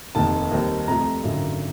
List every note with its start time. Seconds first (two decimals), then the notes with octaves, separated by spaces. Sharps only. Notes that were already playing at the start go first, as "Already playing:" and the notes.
0.15 F1 D#2 D#3 A5
0.52 D#2 D#3 G3 C4
0.88 F2 C3 F3 A3 A#5
1.24 G#1 F#2 D3